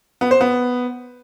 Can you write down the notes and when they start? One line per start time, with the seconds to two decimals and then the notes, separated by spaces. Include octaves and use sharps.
0.21 B3
0.31 C5
0.41 B3